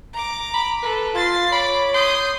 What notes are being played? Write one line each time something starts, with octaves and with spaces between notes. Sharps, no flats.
A#5 D6
B5
A4 B4
F4 A6 C7
C#5 B5 D6
C6 D#6 G6